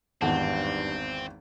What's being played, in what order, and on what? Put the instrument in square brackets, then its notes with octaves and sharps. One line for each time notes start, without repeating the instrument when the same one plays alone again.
[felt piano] G#1 E2 D#3 [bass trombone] G2 [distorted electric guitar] C4 [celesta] F#5 A5